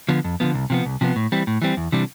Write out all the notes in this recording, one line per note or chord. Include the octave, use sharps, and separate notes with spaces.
D3 F3 B3
F2
D3 F3 B3
C2
C3 F3 B3
C2
C3 F3 B3
A2
E3 G3 C4
A2
E3 G3 C4
E2
C3 E3 G3 D4